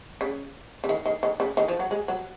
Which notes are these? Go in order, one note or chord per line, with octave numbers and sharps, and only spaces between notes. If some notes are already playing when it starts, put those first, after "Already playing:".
C#3
C#3
D#3
D#3
D#3
C#3
D#3
F3
F#3
G#3
F#3